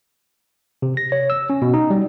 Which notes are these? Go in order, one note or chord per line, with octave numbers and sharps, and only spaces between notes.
C3
A#6
C#5
E6
C#4
B2
D#4
G3